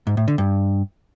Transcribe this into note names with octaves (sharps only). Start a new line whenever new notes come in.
G#2
A2
D3
G2